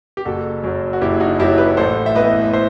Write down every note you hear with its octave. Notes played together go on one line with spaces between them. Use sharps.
G4
F#1 F#4 A4
F#2 F#3
F#4
F#1 E4 G4
D#4 F#4
F#2 F#3 E4 G4
G4 B4
A1 A4 C5
E5
A2 E3 B3 B4 D#5
C5 E5